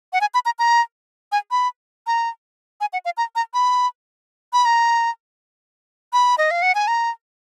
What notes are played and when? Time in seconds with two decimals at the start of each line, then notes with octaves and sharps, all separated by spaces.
0.13 F#5
0.21 G#5
0.34 B5
0.46 A#5
0.59 A#5
1.32 G#5
1.51 B5
2.07 A#5
2.81 G#5
2.93 F#5
3.05 F5
3.17 A#5
3.36 A#5
3.54 B5
4.53 B5
4.65 A#5
6.13 B5
6.38 D#5
6.51 F5
6.62 F#5
6.75 G#5
6.88 A#5